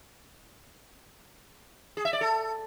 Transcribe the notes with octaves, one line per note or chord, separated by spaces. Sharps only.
G#4
E5
D5
A4